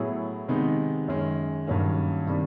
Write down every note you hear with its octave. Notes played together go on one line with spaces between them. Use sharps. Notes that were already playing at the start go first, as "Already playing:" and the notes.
Already playing: A2 F#3 B3 E4 G#4
C3 D#3 G#3 B3 D#4
F#2 D#3 G#3 C#4
G2 D#3 F#3 A#3 C#4
C3 D#3 G3 A#3 D4